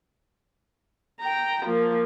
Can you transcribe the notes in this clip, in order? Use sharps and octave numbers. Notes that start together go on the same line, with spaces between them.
G5 A#5
F3 A#3